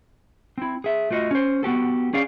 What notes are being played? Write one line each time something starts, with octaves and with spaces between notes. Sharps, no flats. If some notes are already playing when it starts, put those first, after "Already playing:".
C4 E4
G#4 E5
A3 F4 F#4 D#5
C#4 C5
B3 F#4 G4 A4
C#4 G#4 D5 F5